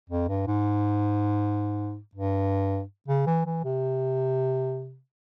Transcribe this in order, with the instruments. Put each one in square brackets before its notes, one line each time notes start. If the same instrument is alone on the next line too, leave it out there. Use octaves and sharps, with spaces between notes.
[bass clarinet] F2
G2
G#2
G2
C#3
E3
E3
C3